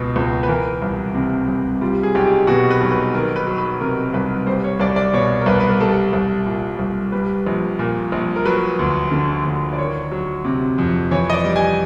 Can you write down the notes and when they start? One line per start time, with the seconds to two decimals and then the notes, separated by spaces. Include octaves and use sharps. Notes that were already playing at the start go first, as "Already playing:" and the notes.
Already playing: C#2 B2
0.16 C#2
0.43 B4
0.48 E3 A#4
0.82 C2
1.14 C3
1.48 C2
1.81 G3 F4
2.03 G#4
2.15 B1 G4
2.47 B2 F#4
2.70 B4
2.81 B1
2.91 B4
3.14 D#3 A#4
3.36 B4
3.47 F#3
3.58 B4
3.80 C3 A#4
4.14 C2 B4
4.47 G3 C5
4.64 C#5
4.80 C2 D5
4.96 D5
5.13 B2 C#5
5.41 A#4
5.46 C2 B4
5.60 B4
5.69 A#4
5.80 G3 A4
6.13 C2
6.46 A#2
6.79 C2
7.12 G3 B4
7.47 A#1
7.79 A#2
8.12 A#1
8.36 A#4
8.45 F#3 B4
8.79 D2
9.11 D3
9.45 D2
9.73 D5
9.78 D#3 C#5
10.11 F#3
10.45 C3
10.78 F2
11.11 E3 C#5
11.30 D#5
11.33 D5
11.44 G3
11.56 G#5